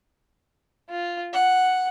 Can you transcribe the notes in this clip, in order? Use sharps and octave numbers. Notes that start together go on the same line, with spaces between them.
F4
F#5